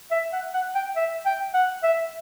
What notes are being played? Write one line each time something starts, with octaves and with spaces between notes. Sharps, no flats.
E5
F#5
F#5
G5
E5
G5
F#5
E5